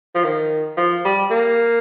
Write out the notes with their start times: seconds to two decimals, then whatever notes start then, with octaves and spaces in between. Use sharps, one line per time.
0.15 F3
0.24 D#3
0.77 F3
1.05 G3
1.31 A#3